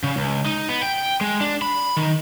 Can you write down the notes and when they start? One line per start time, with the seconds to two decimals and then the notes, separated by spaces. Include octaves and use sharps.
0.04 C#3
0.17 C#2
0.46 D#4
0.69 B3
0.82 G5
1.21 G#3
1.41 D4
1.62 B5
1.97 D#3